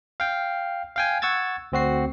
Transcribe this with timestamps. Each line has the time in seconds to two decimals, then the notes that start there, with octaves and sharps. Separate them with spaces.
0.20 F5 G5
0.96 F5 G5 G#5
1.22 F#5 C#6 E6 G#6 A6
1.72 D2 C4 F#4 C7